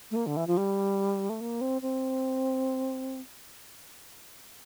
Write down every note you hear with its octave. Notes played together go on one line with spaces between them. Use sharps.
A3
A#3
D3
E3
F3
G3
A3
A#3
C4
C4